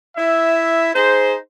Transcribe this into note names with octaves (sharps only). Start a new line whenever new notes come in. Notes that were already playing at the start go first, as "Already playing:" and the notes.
E4 E5
D#4 G#4 C5